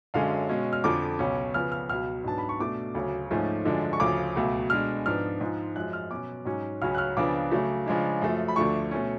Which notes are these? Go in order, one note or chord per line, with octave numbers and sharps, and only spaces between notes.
F#2 D3 G#3 C#4 F5
B2 G#3 C#4
F6
F2 D3 F3 D6
C#2 B2 F#3 C#4
C#3 F3 B3 F6
F6
C#2 B2 F#3 F6
G#2 F#3 B3 D4 A5
B5
C#6
B2 A3 D4 D6
D2 C#3 F#3
G#2 F3 A3 C#4
F#2 D3 F3 G#3 D4
C#6
D2 C#3 F3 D6
C#2 B2 F#3 A3
B2 G#3 D4 F6
G#2 F3 B3 D4 F6
G#2 F3 G#3
F#2 F3 G#3 F#6
F6
B2 F#3 C#4 D6
G#2 F#3 C#4
C#2 C#3 F#3 C#4 F6
F#6
F6
C#2 C#3 F3 B3 D4 D6
C#3 F#3 A3
C#3 F3 G#3 D4
F#2 F3 A3
B5
D2 D3 F3 A3 D4 C#6
B2 A3 C#4